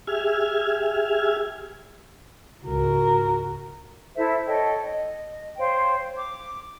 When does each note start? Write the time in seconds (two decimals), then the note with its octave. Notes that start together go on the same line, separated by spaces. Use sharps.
0.07 G4 G#4 E5 F6 G#6
2.64 C#2 G#2 F#4 A#4
4.15 E4 A4 C5 E5
4.47 A4 C#5 D#5 G5
4.83 D#5
5.57 C5 C#5 F5 G5
6.17 D6